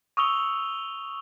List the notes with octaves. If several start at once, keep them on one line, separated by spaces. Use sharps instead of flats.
C#6 D#6 E6 F7 G7